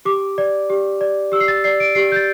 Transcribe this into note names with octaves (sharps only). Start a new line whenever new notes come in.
G4 D6
D5
G4
D5
G4 E6
C7
A6
D5 C7
D7
G4 C7
G6
A6